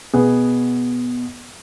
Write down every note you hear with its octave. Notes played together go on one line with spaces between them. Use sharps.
B2 B3 G#4